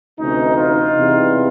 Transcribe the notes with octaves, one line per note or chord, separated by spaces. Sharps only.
D2 C3 E3 C#4 D#4
D#4 F4
E2 C3 E3 G3